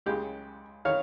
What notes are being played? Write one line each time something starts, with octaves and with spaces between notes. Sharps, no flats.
C#2 C#3 G#3 G4
D#3 C#5 F5